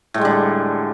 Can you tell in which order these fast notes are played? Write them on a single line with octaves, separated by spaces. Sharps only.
A2 G#3 G3 D3